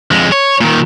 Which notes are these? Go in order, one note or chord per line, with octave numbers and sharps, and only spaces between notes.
F2 G#3
C#5
A#2 D#3